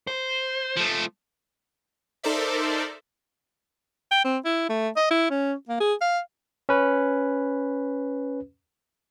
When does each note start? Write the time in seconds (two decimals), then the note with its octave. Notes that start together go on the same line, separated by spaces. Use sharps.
0.07 C5
0.77 F3 A3
2.23 D#4 A4 A#4 C5 D5 E5
4.11 G5
4.25 C4
4.45 E4
4.69 A3
4.97 D#5
5.11 E4
5.30 C#4
5.69 A#3
5.80 G#4
6.01 F5
6.69 C#4 B4